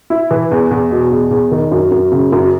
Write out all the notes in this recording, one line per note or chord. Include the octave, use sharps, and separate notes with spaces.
E4
E3
E2
E2
B2
E2
E2
D#3
F#2
F#2
C#3
F#2